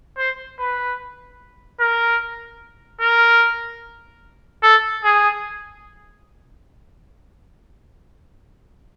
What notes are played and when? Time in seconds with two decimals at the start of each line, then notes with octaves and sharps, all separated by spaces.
0.17 C5
0.58 B4
1.80 A#4
3.01 A#4
4.63 A4
5.04 G#4